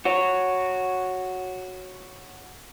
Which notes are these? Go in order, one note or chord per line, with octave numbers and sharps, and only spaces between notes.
F#4 C#5